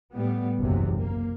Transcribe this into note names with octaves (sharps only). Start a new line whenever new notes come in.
A2 G3 B3
F#1 B1 E2 C3 E3
A#3